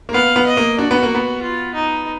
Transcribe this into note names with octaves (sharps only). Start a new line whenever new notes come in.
A#3
B3 F5
B3
D#5
A#3
D4 F#4
B3
A#3
B3
F4
D#4